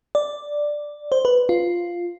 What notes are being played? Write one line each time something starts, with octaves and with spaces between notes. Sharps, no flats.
D5
C5
B4
F4